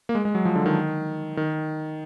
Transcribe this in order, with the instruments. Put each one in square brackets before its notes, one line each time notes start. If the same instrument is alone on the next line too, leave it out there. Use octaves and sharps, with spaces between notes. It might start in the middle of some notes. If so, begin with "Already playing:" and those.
[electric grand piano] A#3
G#3
G#3
F#3
F3
D3
D#3
D#3